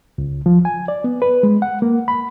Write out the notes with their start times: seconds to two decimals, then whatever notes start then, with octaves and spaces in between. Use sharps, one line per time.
0.18 C#2
0.46 F3
0.65 G#5
0.88 D5
1.04 B3
1.22 B4
1.43 G#3
1.62 F#5
1.82 A#3
2.08 B5